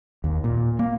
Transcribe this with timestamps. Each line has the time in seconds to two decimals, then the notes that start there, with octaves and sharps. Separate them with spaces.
0.24 D#2
0.44 A#2
0.79 A#3